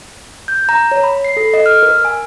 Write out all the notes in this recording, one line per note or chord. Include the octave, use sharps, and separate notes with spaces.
G6
A#5
C#5
B5
C7
A4
D#5
F6
A#4
G#5